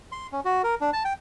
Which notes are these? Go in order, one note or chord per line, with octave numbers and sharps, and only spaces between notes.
C6
C#4
F#4
A#4
D4
A5
G5